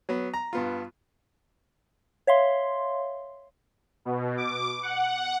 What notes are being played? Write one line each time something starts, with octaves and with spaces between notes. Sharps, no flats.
F#3 B3
A#5
G2 B3 F4
C#5 E5 F5 C6
B2
D6
F#5